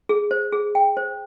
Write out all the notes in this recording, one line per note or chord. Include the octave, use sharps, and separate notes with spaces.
G#4
C5
G#4
G5
C5